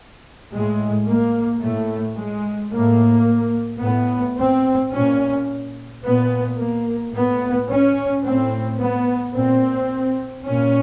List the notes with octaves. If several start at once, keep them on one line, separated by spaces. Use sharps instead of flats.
A2 G#3
A#3
A2 A3
G#3
A2 A#3
A2 B3
C4
A#2 C#4
A#2 B3
A#3
A2 B3
C#4
A2 C4
B3
A#2 C4
A#2 C#4